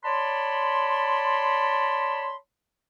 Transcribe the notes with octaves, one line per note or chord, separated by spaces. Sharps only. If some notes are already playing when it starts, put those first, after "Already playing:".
C#5 D5 A5 B5 C6